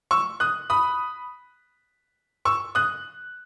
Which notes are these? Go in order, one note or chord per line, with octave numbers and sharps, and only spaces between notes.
C#6 E6
D#6 F#6
B5 D#6
C#6 E6
D#6 F#6